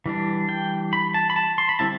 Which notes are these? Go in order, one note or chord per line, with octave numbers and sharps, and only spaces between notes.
E3 G3 D4
G5
B5
A5
B5
A5
C6
B5
D3 G3 C4 E4 A5